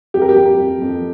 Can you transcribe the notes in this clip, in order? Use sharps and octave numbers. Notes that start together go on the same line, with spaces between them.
F2 G4
A#4
G4
F2
F2
F2